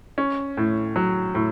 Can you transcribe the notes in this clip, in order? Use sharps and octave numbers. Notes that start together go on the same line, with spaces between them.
C#4
A2
F#3
A2